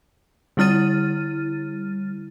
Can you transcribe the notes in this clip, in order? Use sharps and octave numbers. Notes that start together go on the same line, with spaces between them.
D3 G3 E4 F6 A6 D#7